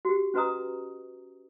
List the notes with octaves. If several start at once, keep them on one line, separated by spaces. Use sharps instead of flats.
F#4 G4
C#4 F#4 B4 D#5 A#5 D#6